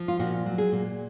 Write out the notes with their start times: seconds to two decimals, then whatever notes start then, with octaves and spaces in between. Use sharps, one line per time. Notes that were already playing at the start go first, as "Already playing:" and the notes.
Already playing: F3
0.08 F4
0.19 A#2 F#4
0.46 F#3
0.58 G#4
0.72 A#2